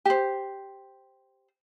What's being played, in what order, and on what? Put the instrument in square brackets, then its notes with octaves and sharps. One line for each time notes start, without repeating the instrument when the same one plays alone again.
[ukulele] G4 C5